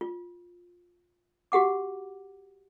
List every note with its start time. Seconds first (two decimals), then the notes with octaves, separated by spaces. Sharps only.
0.01 F4
1.52 F#4 G4 F#5 D6